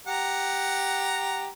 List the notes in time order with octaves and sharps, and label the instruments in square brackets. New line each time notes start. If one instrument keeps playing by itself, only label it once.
[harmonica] G4 F#5 A#5